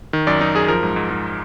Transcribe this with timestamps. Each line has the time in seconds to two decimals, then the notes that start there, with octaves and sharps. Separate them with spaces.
0.13 D#3
0.27 F#2 D5
0.41 F#2 D#4
0.54 F#2 G#4
0.68 F3 A#4
0.83 G#2
0.96 G#2
1.10 G#2